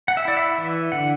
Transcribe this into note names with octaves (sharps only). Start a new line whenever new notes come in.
F#5
E5
E4 D5
E5
E3
D3 F#5